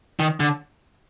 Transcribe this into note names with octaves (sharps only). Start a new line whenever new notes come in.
D#3
D3